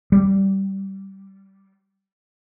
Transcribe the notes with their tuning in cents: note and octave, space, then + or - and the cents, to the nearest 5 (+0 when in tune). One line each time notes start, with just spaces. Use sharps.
G3 -15